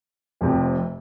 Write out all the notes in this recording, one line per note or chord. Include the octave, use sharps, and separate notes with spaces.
F1 F2 C3